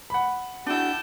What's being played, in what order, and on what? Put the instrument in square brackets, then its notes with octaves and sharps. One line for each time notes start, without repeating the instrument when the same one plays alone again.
[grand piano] F#5 B5
[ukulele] D4 E4 [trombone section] F#4 G#4 [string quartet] G5 A5 G6